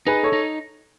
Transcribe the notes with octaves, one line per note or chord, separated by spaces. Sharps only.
D#4 G#4 B4
A4 C#5
D#4